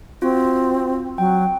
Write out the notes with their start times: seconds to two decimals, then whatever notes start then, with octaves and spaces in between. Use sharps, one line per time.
0.22 C4 F4 F#4
1.18 F#3 G5